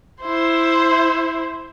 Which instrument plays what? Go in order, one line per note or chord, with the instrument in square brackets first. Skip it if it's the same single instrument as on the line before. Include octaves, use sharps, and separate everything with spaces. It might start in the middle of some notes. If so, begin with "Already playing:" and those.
[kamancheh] E4 C5